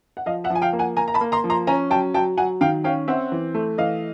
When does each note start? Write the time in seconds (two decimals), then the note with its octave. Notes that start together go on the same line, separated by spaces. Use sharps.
0.17 F#5
0.26 F3 D#5 F5
0.44 E5 F#5
0.50 F3
0.55 G#5
0.62 F5 G5
0.73 A#3
0.79 F#5 G#5
0.97 A#3 G#5 A#5
1.08 A#5
1.14 A5 B5
1.21 A#3
1.32 A#5 C6
1.44 F3
1.50 A#5 C6
1.67 C#4 G#5 A#5
1.90 F#3 G5 A5
2.14 F#3 G5 A5
2.37 F#3 F#5 G#5
2.61 D#3 F5 G5
2.84 C#4 F5 G5
3.08 C4 E5 F#5
3.32 E3
3.54 A3
3.78 E3 D#5 F5